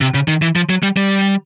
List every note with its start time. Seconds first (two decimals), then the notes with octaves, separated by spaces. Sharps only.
0.01 C3
0.14 C#3
0.28 D#3
0.42 E3
0.56 F3
0.69 F#3
0.83 G3
0.97 G3